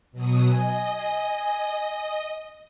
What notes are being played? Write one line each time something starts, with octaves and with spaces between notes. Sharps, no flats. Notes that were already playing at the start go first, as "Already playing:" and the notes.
B2 F#3 D#6
D#5 G#5
G#5